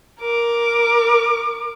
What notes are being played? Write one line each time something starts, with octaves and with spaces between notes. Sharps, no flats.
A#4 D6